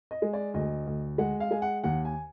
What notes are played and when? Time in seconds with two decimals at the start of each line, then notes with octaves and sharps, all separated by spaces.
0.11 D#5
0.22 G#3
0.33 D5
0.54 D2 D#5
0.87 D2
1.18 G#3 F#5
1.40 F5
1.51 G#3 G#5
1.62 F#5
1.84 D#2 F#5
2.05 G#5